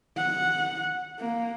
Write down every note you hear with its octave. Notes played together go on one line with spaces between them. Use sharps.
F#5
A#3